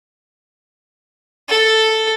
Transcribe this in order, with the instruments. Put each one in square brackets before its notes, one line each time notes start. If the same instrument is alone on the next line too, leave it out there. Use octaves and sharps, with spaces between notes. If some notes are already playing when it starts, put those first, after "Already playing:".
[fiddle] A4